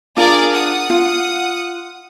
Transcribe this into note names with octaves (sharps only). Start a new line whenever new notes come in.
D4 F4 G#4 A#4 D5
F#5 D#6
F4